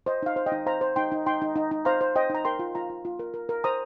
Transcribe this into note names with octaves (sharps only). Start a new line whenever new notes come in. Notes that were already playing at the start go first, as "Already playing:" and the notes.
C5 D#5
D#4 F5
C5
D#5 G5
D#4
C5 F5 A#5
C5
D#4 G5 C6
D#4
D#4 G5 C6
D#4
D#4
D#4
C5 F5 A#5
C5
C5 D#5 G5
D#4 A#5
A#4 G5 C6
F4
F4 F5 A#5
F4
F4
A#4
A#4
A#4
C5 A#5 D#6